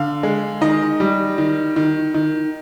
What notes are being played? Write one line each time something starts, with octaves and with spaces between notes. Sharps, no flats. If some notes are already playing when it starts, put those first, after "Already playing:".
Already playing: D3 F5
G#3
D#3 D#5
G3
D#3
D#3
D#3